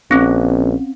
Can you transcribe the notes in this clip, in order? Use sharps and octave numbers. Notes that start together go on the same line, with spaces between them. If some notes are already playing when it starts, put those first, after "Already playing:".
A#1 C4 C#4